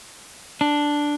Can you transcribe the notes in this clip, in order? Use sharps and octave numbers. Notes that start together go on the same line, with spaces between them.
D4